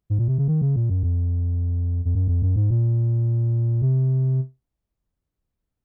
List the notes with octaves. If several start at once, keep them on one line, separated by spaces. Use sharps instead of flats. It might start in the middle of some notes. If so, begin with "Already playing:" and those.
G#2
A#2
C3
C#3
D#3
C#3
A#2
F#2
F2
F2
F#2
F2
F#2
G#2
A#2
C3